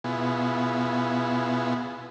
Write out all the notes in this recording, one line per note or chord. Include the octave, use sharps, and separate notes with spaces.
B2 B3 E4 F4 G#4